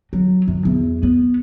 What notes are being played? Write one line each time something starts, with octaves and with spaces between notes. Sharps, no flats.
F#3
F#2
E2
B3